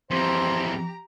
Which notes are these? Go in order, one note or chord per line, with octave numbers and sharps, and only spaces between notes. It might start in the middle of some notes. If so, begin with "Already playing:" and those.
F2 E3 G4 C5 A#5